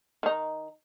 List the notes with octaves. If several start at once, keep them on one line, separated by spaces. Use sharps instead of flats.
D#3 D#4